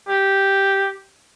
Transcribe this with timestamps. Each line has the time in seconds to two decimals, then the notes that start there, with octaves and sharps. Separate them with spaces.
0.08 G4